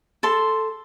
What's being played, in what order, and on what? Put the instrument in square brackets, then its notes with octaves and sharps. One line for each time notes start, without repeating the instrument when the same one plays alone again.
[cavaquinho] A4 A5 C6